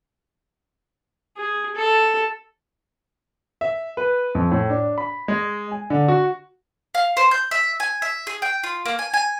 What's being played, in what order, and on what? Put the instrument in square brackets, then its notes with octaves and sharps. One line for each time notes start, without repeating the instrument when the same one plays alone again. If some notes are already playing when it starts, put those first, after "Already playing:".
[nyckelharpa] G#4
A4
[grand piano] E5
B4
F2
A2
D4
B5
G#3
G#5
D3
F#4
[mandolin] F5
C5
G6
E5
G#5
E5
G#4
G5
F4
A#3
G#5
G#5